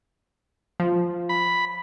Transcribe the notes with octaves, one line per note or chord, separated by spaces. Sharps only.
F3
B5